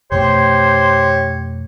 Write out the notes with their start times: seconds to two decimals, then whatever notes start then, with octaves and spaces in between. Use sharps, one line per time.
0.12 F2 B2 A3 G4 C5 C#5